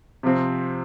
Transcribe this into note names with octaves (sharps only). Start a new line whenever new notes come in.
C3 F3 C4